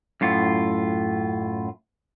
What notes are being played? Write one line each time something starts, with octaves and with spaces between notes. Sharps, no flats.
F#2 A2 F4